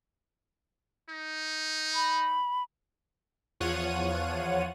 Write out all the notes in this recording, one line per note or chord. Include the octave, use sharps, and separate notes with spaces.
D#4
B5
E2 F3 F4 C#5 F#5 D#7